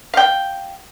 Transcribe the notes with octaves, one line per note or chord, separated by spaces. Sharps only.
F5 G5